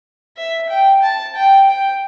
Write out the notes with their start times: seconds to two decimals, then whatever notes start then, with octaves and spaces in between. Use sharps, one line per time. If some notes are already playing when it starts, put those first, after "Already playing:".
0.37 E5
0.69 G5
1.03 A5
1.35 G5
1.68 G5